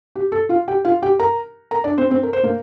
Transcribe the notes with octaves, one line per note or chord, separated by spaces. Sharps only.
G4
A4
F4 F5
G4 G5
F4 F5
G4 G5
A#4 A#5
A#4 A#5
D4 D5
C4 C5
C4 C5
A#4
C5
A#3 A#4